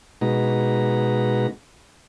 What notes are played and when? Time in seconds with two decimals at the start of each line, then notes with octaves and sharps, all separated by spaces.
0.21 B2 G#3 D#4 F#4 B4 A#5